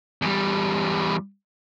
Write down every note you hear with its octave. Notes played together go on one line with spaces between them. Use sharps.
E2 G3